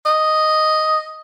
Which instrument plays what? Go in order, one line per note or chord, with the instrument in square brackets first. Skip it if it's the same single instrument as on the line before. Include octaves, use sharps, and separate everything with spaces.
[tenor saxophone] D#5